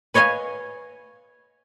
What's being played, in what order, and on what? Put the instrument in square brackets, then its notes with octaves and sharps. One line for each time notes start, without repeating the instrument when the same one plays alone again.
[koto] B4 C#5 D#5 F5 G#5